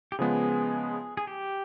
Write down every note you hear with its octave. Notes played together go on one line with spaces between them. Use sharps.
G4
C#3 F3 G#3 B3 G#4
G#4
G4